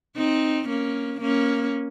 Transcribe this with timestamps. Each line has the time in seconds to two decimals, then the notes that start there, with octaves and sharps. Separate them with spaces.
0.17 C4 D#4
0.69 A#3 C#4
1.21 A#3 C#4